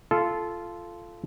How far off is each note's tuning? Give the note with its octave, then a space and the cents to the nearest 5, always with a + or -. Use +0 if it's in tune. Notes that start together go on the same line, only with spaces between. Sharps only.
F4 -15 A4 -15